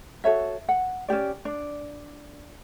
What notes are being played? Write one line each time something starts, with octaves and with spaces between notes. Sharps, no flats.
F#4 A4 C#5 E5
F#5
C#4 D4 G4 D5
D4 D5